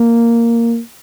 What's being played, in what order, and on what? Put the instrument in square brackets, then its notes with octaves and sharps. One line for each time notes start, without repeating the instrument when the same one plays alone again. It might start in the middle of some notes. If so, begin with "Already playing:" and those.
Already playing: [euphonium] A#3